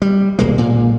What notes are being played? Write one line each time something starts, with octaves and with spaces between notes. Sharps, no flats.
G3
D#1 B1 G#3 A#3
A#2